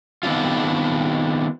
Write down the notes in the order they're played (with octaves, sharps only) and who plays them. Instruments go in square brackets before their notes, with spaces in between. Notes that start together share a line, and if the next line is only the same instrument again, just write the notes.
[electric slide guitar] D#3 B3 C4 D4 F4